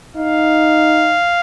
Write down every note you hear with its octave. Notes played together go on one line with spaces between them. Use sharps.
D#4 F5